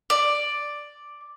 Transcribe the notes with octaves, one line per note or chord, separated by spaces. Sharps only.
D5